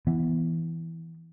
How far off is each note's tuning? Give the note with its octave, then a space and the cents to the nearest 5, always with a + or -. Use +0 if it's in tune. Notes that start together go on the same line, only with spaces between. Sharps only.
E3 +0 B3 +0